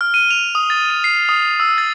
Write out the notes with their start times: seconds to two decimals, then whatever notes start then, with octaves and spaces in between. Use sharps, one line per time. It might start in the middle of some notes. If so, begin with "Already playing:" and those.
0.01 F6
0.14 D#7
0.30 F7
0.55 D#6
0.70 A6
0.90 D#7
1.04 C7
1.29 D#6
1.60 E6
1.78 A6